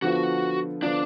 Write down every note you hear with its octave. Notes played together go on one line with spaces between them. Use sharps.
D3 F3 B3 F4 F#4
D3 F3 B3 D4 F4